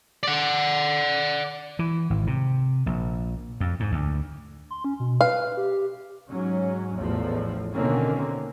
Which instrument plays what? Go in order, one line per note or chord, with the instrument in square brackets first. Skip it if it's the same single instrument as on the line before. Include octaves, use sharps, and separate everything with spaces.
[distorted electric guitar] D5 F#5
[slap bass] E3
G#1
C3
A#1
F2
G#2
D2
[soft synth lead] C6
C#4
B2
[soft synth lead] B4 [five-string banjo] F5
[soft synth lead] G4
[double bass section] G#2 F#3 C#4
A1 E2 A2 F3
B2 D3 D#3 A#3 C4 C#4